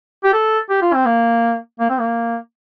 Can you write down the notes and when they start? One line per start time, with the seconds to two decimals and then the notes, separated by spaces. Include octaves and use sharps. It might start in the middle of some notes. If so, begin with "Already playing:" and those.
0.24 G4
0.33 A4
0.70 G4
0.82 F4
0.94 C4
1.06 A#3
1.79 A#3
1.89 C4
2.00 A#3